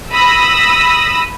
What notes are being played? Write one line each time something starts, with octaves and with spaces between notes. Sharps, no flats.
B5 D#6 E6 A#6